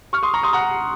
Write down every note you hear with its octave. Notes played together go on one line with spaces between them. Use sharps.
C#6 F6
C6 D#6
A#5 C#6
C6 D#6
F#5 A#5